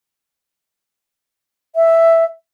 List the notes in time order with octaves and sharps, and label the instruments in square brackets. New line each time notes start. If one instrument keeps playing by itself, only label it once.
[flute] E5